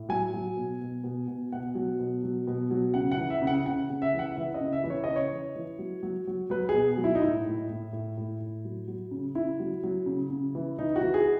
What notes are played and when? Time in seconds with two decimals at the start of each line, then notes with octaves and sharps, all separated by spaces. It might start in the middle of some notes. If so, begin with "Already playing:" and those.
Already playing: A2
0.09 F#3 G#5
0.34 F#3
0.57 B2
0.81 B2
1.04 B2
1.28 B2
1.52 B2 F#5
1.75 F#3
1.99 B2
2.24 F#3
2.47 B2
2.71 F#3
2.94 C#3 F#5
3.12 F#5
3.17 E3
3.30 E5
3.42 C#3
3.47 F#5
3.65 C#3 F#5
3.90 C#3
4.02 E5
4.14 E3
4.19 F#5
4.36 E3 E5
4.54 D#5
4.61 C#3
4.73 E5
4.84 E3
4.90 C#5
5.04 C#3 D#5
5.16 C#5
5.32 E3
5.56 E3
5.79 F#3
6.03 F#3
6.27 F#3
6.50 F#3 B4
6.69 G#4
6.74 B2
6.97 F#3
7.04 E4
7.15 D#4
7.22 A2 E4
7.45 A2
7.69 A2
7.93 A2
8.17 A2
8.40 A2
8.65 F#3
8.88 F#3
9.11 C#3
9.35 C#3 E4
9.60 F#3
9.84 F#3
10.06 C#3
10.30 C#3
10.55 E3
10.79 E3 D#4
10.96 F#4
11.01 E3
11.14 G#4